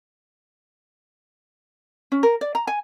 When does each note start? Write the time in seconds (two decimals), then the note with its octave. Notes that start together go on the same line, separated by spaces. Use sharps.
2.12 C#4
2.23 A#4
2.41 D5
2.55 A#5
2.67 G#5